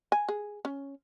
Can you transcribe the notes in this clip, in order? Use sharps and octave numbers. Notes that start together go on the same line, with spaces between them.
G#5
G#4
C#4